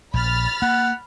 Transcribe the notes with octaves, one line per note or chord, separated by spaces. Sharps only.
A#1 B5 F6 A6
A#3 F#5